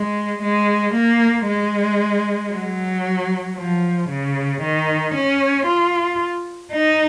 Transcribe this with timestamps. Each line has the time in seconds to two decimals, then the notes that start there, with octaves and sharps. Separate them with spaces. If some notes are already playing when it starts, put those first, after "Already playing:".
Already playing: G#3
0.42 G#3
0.95 A#3
1.48 G#3
2.53 F#3
3.57 F3
4.10 C#3
4.62 D#3
5.15 C#4
5.67 F4
6.73 D#4